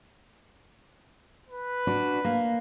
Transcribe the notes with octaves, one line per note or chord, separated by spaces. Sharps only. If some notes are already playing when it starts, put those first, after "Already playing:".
B4
D4 F#4
A#3